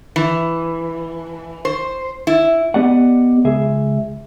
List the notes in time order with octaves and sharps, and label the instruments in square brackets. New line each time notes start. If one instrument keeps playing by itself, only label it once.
[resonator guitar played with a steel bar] E3
C5
E4
[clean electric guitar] B3 G4 D5 D#5 F#5
C#2 G#4 E5